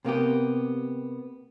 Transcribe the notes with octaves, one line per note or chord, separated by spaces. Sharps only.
C3 A#3 B3 G4